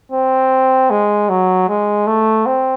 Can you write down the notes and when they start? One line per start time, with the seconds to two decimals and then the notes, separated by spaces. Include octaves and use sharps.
0.12 C4
0.90 G#3
1.29 F#3
1.68 G#3
2.07 A3
2.46 C4